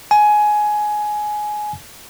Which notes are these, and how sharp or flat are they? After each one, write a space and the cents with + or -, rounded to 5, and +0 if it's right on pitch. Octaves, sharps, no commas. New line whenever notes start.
G#5 +15